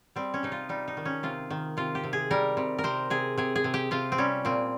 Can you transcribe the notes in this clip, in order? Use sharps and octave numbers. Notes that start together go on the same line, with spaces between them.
G3 C4
C#4
C3 D#4
F4
G3 D#4
D#4
D#3
C#4
C3 F4
D#3
C3 F4
G4
C3
G#4
G3 A#4
C3
A#4
C3 C5
C3 G#4
C3 G#4
G#4
C3
G4
C3 F4
C4
G3 C#4
A#2 C4